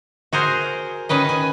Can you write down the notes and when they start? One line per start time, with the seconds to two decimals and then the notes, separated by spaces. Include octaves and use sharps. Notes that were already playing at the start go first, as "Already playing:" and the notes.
0.33 F#4 G#4 A#4 C5
1.09 D#3 C#4 B4 D#5
1.29 G#5